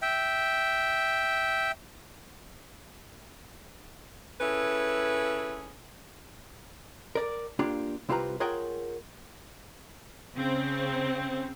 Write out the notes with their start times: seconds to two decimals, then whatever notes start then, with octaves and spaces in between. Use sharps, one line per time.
0.02 E5 G5
4.41 C#4 E4 G#4 A4 B4
7.15 A#4 D5
7.59 A#3 D4 F4 G4
8.09 C2 C4 F4 G4 B4 A#5
8.40 F4 G#4 A#4 C#5 F#5 G5
10.35 C#3 C4